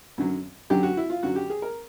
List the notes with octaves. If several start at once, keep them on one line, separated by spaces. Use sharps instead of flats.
F#2 D3 F#3
F#2 D3 F#3 G4
F#4
E4
F4
F#2 D3 F#3 F#4
G4
G#4
A#4